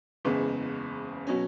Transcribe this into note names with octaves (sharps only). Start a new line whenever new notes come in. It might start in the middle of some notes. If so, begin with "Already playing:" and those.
F#1 E2 C#3 G#3 B3
B2 F#3 C#4